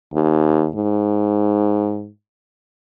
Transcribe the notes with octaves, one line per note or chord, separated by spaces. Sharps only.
D#2
G#2